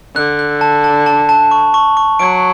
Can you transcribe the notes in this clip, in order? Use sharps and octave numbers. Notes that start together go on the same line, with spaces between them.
D3 F#6
F#6
A5
A5
A5
A5
C#6
C#6
C#6
F#3 D7